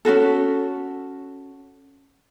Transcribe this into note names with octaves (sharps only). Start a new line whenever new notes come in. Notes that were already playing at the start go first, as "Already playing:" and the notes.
C#4 F4 F#4 A4